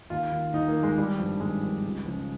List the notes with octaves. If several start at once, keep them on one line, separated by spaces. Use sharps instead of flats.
D#2 F4
D#3
D#2 D#4
A#3
D#3
G#3
G#1 G3
G2 F3
G#1 G#3
G2 F3
C#2
C#3 F3